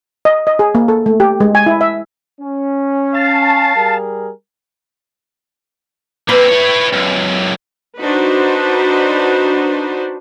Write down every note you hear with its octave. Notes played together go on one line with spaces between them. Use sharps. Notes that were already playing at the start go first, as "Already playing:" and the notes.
D#5
D#5
G#4
A#3
A4
A3
G4
G#3
G#5
E4
E5
C#4
F5 A5
G3 G#4 A#4
A#3 C4 B4
E4 C#5
C#2 F#2
D4 D#4 F#4 B4 C5